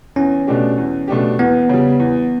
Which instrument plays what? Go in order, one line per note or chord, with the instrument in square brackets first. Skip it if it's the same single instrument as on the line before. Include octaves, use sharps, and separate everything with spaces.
[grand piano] E2 [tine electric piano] C#4
[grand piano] B2 A3 D4 G4
E2
B2 A3 D4 G4
[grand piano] E2 [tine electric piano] B3
[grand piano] C#3 G3
E2